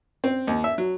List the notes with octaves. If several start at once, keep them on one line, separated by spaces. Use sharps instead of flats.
C4
D#2
E5
F#3